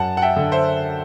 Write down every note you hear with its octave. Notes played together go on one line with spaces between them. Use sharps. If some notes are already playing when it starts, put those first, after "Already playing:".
Already playing: F#2 F#5 A5
F#5
E5 G5
D3
C5 E5